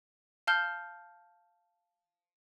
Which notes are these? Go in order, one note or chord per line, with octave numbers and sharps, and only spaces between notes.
F5 A5 F6 G6 G7